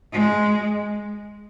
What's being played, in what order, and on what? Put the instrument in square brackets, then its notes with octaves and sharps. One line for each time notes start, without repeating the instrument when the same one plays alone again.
[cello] G#3